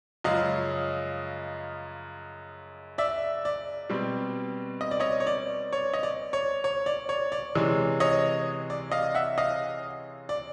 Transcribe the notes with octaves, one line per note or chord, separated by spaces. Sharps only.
F#2 C#3 F3 G#3 D#5 F5
D5 E5
D5
B2 G3 C4
D#5
D5
C#5 D#5
C#5
D5
C#5
D#5
D5
C#5
C#5
D5
C#5
D5
C3 E3 G#3 C#4
C#5 D#5
D5
D#5 F5
E5 F#5
D#5 F5
D5